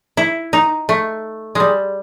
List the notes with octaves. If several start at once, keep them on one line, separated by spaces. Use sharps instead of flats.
E4
D#4
A3
G3 G#3